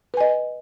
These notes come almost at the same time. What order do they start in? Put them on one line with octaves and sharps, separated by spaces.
B4 G#5 D#5